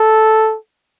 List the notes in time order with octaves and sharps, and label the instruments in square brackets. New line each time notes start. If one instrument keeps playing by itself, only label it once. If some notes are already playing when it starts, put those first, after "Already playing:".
Already playing: [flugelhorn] A4